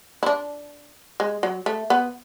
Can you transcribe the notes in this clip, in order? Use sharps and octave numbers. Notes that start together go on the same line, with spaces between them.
E4
D4
G#3
F#3
A3
B3